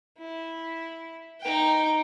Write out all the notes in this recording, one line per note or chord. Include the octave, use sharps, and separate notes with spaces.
E4
D#4 G5